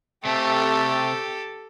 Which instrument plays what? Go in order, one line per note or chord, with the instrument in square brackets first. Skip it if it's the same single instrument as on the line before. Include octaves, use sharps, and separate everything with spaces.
[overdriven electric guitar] C3 C4 [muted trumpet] A3 [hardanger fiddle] G4 A4